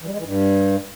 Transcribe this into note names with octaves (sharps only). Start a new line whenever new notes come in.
E3
G3
G#3
E3
G2